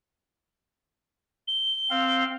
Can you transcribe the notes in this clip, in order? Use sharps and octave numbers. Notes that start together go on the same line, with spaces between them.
G7
C4 F5